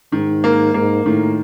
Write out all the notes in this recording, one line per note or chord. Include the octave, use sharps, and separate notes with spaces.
G#2 D#3
A#3
G#2 A#3
A2 D#3